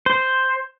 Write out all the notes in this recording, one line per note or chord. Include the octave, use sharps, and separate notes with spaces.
C5